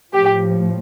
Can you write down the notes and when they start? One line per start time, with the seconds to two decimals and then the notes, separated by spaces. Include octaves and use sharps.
0.13 A2 F3 G4